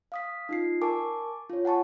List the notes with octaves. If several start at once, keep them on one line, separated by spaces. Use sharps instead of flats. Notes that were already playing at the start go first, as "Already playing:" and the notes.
F5 D#6 B6
D#4 F4 C7
A#4 G#5 A5 C#6 D6
F4 C#5
F#5 G#5 A5 C#6